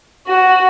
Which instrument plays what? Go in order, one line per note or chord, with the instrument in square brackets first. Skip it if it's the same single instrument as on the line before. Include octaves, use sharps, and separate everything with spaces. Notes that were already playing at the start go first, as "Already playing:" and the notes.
[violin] F#4